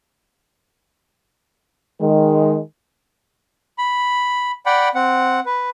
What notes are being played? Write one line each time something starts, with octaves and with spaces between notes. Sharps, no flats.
D#3 G#3
B5
D5 F#5 G5 B5
C4 F#5
B4